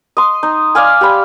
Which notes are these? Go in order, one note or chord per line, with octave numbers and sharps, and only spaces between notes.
D#5 C6
D#4
D5 F5 G#5
G4 D5 B5